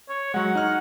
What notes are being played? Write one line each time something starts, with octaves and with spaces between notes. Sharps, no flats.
C#5
F#3 G#3 F#5
D#4 F6